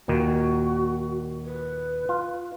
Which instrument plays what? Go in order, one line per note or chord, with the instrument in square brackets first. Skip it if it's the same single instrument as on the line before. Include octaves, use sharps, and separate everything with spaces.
[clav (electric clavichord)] D#2 A#2 D#3 [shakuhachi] F#4
[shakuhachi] B4
[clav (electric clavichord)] F4